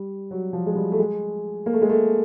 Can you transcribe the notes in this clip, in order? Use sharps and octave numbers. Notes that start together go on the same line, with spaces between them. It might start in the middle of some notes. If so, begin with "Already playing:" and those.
Already playing: G3
F#3
F3
G#3
G3
A3
G#3
A#3
A3
G#3
A3